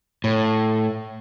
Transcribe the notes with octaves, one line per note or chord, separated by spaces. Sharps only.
A2